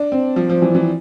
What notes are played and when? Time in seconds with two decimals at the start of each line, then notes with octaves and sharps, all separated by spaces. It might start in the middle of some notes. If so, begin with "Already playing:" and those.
Already playing: D4
0.12 C4
0.36 F3
0.49 F3
0.62 E3
0.75 E3